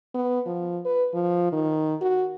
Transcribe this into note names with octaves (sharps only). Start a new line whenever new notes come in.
B3
F3
B4
F3
D#3
F#4